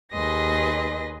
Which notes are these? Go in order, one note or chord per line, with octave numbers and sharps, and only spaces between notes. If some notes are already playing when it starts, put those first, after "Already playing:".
D#2 G#4 B4 D#5 C6 A#6